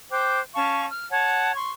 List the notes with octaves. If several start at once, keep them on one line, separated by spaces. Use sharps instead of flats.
C5 G5 D6 F#6
C#4 F5 A5 C#6
F6
C#5 F#5 A5
C6 C#6